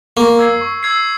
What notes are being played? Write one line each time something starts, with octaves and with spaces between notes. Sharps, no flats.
A#3 C#6
E6 G#6 C7
C#6
E6 G#6 C7